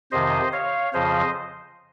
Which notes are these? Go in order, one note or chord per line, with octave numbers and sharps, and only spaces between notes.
F2 C3 D#3 C5 D#5
C#5 F5
F2 C#3 F3 C5 D#5